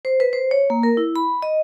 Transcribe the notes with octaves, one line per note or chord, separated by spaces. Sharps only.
C5
B4
C5
C#5
A#3
A#4
E4
B5
D#5